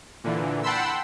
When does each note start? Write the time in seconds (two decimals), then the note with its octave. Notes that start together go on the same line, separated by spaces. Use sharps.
0.24 A#2 D3 E3
0.63 F#5 G5 A5 B5 C6 E6